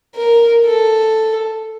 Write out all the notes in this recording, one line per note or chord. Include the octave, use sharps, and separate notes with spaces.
A#4
A4